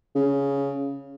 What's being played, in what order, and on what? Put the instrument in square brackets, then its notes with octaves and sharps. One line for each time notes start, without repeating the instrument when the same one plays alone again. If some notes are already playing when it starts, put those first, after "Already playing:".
[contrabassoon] C#3